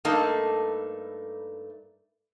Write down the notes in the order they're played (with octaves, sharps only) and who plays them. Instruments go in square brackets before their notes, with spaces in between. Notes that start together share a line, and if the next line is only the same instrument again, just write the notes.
[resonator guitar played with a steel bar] G2 A3 A#3 D#4 A4